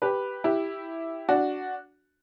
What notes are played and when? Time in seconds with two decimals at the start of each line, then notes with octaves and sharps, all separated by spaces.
0.02 G4 B4
0.44 E4 G4
1.29 D4 F#4